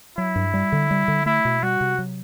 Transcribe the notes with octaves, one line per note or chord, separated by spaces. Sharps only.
F#3 E4
G2
G3
D3
G3
D3
A3 E4
B2
G3 F#4
C3
F#3